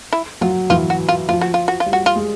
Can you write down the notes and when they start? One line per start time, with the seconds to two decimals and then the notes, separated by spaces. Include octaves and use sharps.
0.13 E4
0.41 F#3 F4
0.70 E3 F4
0.90 F#4
1.09 F4
1.28 F3 F4
1.41 F#4
1.54 F4
1.68 F#4
1.80 F4
1.86 G3
1.93 F#4
2.06 F4
2.16 G#3